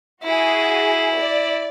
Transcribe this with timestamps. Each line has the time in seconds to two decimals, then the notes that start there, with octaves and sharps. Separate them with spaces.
0.23 E4 F#4 G#4
1.18 D5